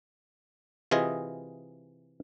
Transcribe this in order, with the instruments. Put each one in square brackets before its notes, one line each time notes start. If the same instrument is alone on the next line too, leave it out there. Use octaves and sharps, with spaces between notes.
[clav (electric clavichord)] C3 E3 F4 G#4 D#5